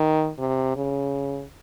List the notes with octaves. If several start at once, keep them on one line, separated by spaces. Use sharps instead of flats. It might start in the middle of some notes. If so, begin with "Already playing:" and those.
Already playing: D#3
C3
C#3